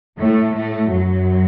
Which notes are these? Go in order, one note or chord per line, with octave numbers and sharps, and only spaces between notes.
A2 A3
A2 A3
F#2 F#3